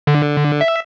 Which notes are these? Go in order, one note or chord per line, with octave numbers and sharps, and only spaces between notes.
D3
E5